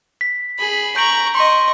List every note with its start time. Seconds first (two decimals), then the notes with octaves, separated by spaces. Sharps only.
0.21 B6
0.59 G#4 B5
0.96 A#5 C#6 G6 D7 F#7
1.35 D#5 C6 C#6